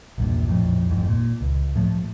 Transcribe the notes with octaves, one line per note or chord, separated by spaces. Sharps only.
A#1 E2 G2 A#2
A#1 F2 A2
G1 F2 G#2
A#2
C#2
A2 F3 A3